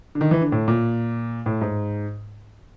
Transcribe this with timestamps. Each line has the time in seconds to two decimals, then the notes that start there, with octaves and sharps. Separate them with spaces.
0.15 D3
0.21 D#3
0.31 E3
0.41 D3
0.52 A2
0.68 A#2
1.46 A2
1.61 G#2